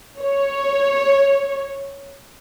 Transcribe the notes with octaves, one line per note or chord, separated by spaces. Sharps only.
C#5